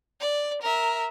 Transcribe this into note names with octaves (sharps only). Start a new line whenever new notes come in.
D5
A#4 E5